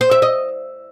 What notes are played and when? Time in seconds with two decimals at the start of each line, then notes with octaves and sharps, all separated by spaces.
0.01 C5
0.11 E5
0.22 D#5